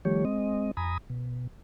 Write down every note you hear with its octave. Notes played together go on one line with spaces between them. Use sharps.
D#3 F3 G3 A3 G4 C#5
G#3 C4 D#5
F2 G#5 A#5 B5 D#6
B2